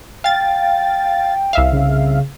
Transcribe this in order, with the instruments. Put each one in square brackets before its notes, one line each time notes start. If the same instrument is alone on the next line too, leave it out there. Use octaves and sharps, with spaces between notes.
[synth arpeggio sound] F5 A6 [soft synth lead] G5
[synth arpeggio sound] C2 E5 F5
[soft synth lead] C#3